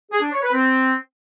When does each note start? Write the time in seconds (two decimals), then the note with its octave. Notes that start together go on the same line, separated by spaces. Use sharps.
0.11 G#4
0.21 D4
0.31 C#5
0.42 B4
0.52 C4